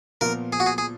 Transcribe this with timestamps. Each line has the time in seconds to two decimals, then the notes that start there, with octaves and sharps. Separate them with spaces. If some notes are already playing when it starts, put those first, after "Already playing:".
0.21 A#2 F3 B3 F4 A#4
0.53 G#4
0.60 F#4
0.66 G#4
0.78 G#4